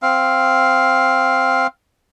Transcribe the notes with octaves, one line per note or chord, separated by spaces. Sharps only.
C4 F5